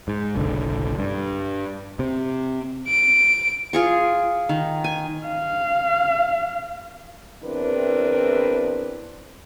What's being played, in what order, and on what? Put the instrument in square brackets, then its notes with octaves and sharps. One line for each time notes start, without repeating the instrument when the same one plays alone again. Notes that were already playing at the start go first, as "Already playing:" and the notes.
[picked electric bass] G#2
F#1 B1 D3
G2
C3
[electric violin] D7
[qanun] F4 G#4 C#6
D#3
G#5
[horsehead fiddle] F5
[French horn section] E2 C4 D4 E4 A#4 B4